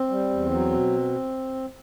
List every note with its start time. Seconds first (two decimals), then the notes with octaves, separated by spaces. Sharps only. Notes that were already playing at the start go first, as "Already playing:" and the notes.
Already playing: C4
0.09 G3
0.30 E2
0.51 F#3
0.71 B2